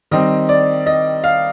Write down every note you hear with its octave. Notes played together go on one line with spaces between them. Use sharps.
D#3 G3 C4 D#5
D5
D#5
F5